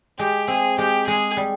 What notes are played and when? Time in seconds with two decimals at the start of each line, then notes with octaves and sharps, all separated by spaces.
0.19 G#3 G4
0.48 C4 G#4
0.78 G#3 G4
1.07 G#3 G#4
1.37 G3